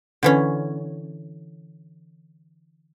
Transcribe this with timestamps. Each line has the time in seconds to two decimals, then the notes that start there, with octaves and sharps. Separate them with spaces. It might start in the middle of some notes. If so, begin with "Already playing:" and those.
0.23 D3 E3 C#4